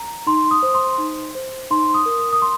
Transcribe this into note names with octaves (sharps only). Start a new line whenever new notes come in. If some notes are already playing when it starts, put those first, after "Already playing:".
Already playing: A#5
D#4 C6
D#6
C5
C6
D#4
C5
D#4 C6
D#6
A#4
D#6
D#6
C6